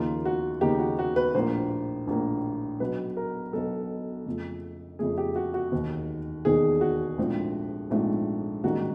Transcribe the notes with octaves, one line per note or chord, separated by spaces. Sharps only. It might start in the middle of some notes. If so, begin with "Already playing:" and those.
Already playing: D#2 C#3 F3 A#3 D#4 F4
F#4
D#2 C#3 F3 A#3 D#4 G4
F#4
F#4
B4
A#1 A2 F3 A#3 C5
A#1 A2 F3 A#3
B1 B2 F#3 B4
A#4
B1 B2 F#3 A4
F2 C#3 F3 A3
F2 C#3 F3 A3 G#4
G4
F#4
F#4
E1 D#2 D#3
E1 D#2 D#3 G#4
F#4
A#1 G#2 F3 A3 C4
A#1 G#2 F3 A3 C4
A1 G#2 D#3 G3 A#3 F#4